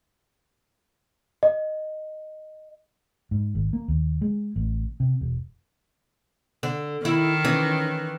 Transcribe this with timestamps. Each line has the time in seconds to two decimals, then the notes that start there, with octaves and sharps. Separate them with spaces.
1.43 D#5
3.31 G#2
3.55 G#1
3.73 A#3
3.88 D#2
4.21 G#3
4.56 A1
5.00 C3
5.21 E1
6.63 D3
7.05 D#3 E4
7.45 E3 C#4